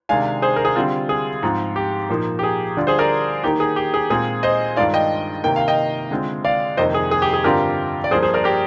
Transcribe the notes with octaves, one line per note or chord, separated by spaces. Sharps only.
C3 D#3 G#3 D4 F5 G#5
G#4 C5
A#4
G#4
D3 G3 C4 F4
G#4
G#2 F3 C4 F4
G4
A#2 F3 A#3 D#4
G4
G#4
D3 G3 D4 F4
G#4 C5
A#4 D5
D#3 A#3 D#4 G4
G#4
G4
G#4
A#2 G#3 C4 F4 G#4
C5 D#5
G2 D#3 G#3 D4 F4 D5 F5
D#5 G5
C3 D#3 A#3 G5
F5
D#5 G5
D3 G#3 C4 F4
D5 F5
F2 C3 D#3 A#3 C5 D#5
G#4
G#4
G4
G#4
G2 D3 G3 C4 F4 G4 A#4
D5
G2 F3 A#3 G#4 C5
G#4 C5
A#4 D5
G4 A#4